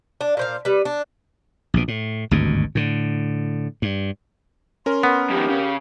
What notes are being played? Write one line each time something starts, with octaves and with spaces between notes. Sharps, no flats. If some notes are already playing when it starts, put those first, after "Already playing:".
D4
A#2 C5 F5
G3 B4
D4
A#1 B2
A2
G#1 D2 G2 B2
A2 D3
G2
C#4 A#4 C6
B3
F2 D#3 G4
C#3